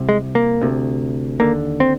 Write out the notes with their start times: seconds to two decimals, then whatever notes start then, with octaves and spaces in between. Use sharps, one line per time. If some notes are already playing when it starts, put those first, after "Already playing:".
Already playing: C2 C3
0.09 G#3
0.35 A#3
0.62 D2 C3
1.40 D#2 D3 A#3
1.80 C4